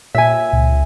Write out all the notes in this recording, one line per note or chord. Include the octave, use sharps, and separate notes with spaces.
A#2 E5 G#5
C#2